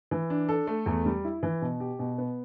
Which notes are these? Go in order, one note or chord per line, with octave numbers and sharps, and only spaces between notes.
E3
D4
A4
A3
E2
G3
E4
E3
B2
G4
B2
B3